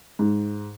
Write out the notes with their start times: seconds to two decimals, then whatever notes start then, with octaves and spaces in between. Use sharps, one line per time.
0.19 G#2